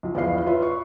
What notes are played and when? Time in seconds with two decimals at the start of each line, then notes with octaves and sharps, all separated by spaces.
0.03 B1 F4
0.15 E2 F3 E4 D5 F5 C7
0.46 F4 B4 C#5 E5 C6
0.62 C#6